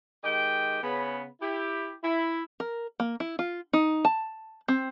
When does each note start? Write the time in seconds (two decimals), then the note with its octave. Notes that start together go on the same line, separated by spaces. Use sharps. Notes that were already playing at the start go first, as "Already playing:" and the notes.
0.23 D#3 G#3 G4 D#5 G5
0.83 C#3 B3 B5
1.41 E4 G4
2.04 E4
2.60 A#4
3.00 A#3
3.20 E4
3.39 F4
3.73 D#4
4.05 A5
4.68 C4